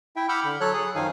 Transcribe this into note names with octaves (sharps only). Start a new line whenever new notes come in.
E4 E5 G5
F#5 B5 D6 E6 F6 G6
D3
F#3 A4 C#5 F#6
G#4 D#6
F#2 D#3 F3 D#4 F5 G#5